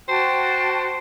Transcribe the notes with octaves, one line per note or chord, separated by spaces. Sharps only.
F#4 C5 G5 A5